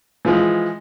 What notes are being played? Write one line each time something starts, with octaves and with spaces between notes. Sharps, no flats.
E3 F3 G#3